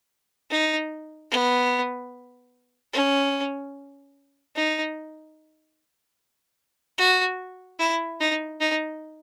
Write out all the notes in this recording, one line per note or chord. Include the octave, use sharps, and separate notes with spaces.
D#4
B3
C#4
D#4
F#4
E4
D#4
D#4